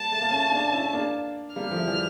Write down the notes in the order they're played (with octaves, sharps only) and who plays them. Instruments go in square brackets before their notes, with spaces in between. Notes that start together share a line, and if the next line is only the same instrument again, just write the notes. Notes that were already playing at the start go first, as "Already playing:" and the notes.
Already playing: [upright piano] G3 A#3 [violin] A5
[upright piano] A3
A#3
A3 C#4
A#3 D4
C#4 E4
A#3 D4
[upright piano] G3 A#3 [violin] F6
[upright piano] F3 A3
E3 G3